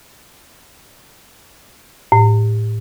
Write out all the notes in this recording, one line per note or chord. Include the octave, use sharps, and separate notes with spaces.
A2